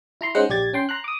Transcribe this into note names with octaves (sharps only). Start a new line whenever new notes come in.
E4 A#5 C6
G#3 C#4 D#4 C5 F#5
A#1 G4 D5 G#6 A6
C#4 G5 C6
A#5 C6 F#6
D6 D#6